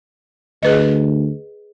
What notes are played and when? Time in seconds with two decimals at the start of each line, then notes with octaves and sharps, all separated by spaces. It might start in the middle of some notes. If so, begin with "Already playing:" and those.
0.63 D2 G#4 B4 D#5